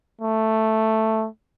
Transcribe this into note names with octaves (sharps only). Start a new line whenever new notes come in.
A3